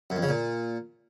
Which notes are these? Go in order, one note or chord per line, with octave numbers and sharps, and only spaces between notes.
F#2
F2
C#3
A#2